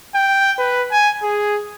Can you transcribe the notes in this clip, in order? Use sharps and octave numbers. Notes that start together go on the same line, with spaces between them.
G5
B4
G#5
G#4